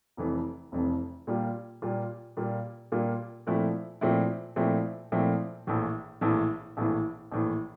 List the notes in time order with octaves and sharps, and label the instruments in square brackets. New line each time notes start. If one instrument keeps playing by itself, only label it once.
[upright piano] F1 F2 E3
F1 F2 E3
A#2 G3 A#3 F4
A#2 G3 A#3 F4
A#2 G3 A#3 F4
A#2 G3 A#3 F4
A#2 F3 A3 C4 E4
A#2 F3 A3 C4 E4
A#2 F3 A3 C4 E4
A#2 F3 A3 C4 E4
A#1 A2 E3
A#1 A2 E3
A#1 A2 E3
A#1 A2 E3